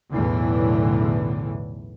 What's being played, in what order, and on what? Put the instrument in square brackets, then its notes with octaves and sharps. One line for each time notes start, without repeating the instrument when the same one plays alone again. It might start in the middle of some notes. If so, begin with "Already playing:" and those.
[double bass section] B1 E2 A2 D3 E3